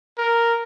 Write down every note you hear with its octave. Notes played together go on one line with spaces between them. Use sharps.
A#4